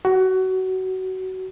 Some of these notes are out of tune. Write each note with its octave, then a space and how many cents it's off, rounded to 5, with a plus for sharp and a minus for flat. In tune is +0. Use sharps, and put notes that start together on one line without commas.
F#4 +25